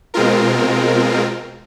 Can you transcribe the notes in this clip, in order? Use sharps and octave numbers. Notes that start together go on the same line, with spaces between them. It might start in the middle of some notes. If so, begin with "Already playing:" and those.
B2 G#3 C4 F4 A#4